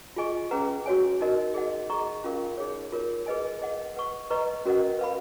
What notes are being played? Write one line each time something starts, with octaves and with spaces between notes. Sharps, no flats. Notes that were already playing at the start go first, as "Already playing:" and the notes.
F4 G#4 D#5 G#5 C#6
C#4 G#4 B4 F#5 A#5
F#4 C#5 G#5
D#4 F#4 A#4 D#5
G#4 D#5 F#5
G#4 D#5 A#5 C#6
C#4 F4 A#4 F5
D#4 G#4 C#5
F4 A#4 C#5
G#4 B4 D#5 G#5
G#4 D#5 F#5
B4 F#5 C#6
B4 D#5 A#5 C#6
C#4 F#4 A#4 D#5 F#5
B4 F5 B5